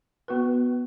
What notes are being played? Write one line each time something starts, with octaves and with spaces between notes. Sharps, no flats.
B3 F#4 B4